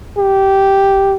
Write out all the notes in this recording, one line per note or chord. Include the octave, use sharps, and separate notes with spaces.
G4